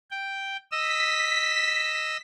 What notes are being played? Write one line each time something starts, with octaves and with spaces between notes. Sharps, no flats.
G5
D#5 E6 B6